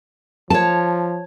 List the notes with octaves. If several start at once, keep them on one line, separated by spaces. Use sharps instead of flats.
F3 C#5 A5